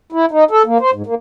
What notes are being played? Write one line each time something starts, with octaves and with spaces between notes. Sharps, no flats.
E4
D#4
A4
A#3
C5
G#2
A#3